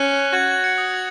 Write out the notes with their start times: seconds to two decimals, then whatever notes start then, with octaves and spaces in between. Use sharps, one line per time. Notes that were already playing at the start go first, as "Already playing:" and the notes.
Already playing: C#4 F#6
0.33 F#4 G#6
0.48 G#6
0.63 G#6 C#7
0.78 D#6
0.94 G#6